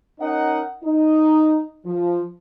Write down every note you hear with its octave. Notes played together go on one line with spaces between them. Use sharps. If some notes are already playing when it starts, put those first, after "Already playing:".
C#4 D#4 A#4 D#5 F#5
D#4
F3